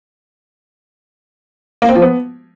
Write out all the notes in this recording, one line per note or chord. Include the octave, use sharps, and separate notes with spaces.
A#3
C4
F3
B3